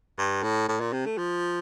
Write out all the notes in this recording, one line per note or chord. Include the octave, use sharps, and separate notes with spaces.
G2
A2
A2
A#2
C3
A3
F3